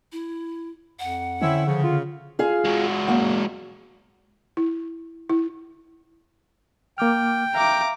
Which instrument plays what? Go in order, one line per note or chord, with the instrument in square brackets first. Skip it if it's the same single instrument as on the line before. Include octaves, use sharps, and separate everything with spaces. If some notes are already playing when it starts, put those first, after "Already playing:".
[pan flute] E4
[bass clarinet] F2 [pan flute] F#5
[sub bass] D3 [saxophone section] C4 C#4 E4
[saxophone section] C#3 [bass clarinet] F3
[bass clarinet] F4
[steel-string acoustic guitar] F4 G#4 F5
[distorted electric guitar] G#3 F#4
[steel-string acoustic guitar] F#2 A#3 F#5
[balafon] E4
E4
[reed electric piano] A#3 D6 F6 [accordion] G5
[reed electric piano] E5 F5 [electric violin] A#5 D6